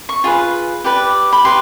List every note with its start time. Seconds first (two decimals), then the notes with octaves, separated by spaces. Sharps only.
0.09 C#6
0.24 F4 G#4 B4
0.84 G4 B4 D5
1.32 B5
1.44 G4 B4 C6